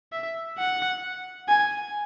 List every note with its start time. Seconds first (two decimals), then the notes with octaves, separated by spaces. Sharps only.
0.12 E5
0.58 F#5
1.48 G#5